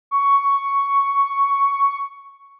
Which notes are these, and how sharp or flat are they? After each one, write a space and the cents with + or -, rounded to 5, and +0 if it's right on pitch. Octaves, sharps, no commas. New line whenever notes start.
C#6 +5